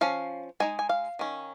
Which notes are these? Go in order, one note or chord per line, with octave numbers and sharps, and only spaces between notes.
F3 C#4 F5
G#3 D#4 G#5
G#5
F5
D#3 C#4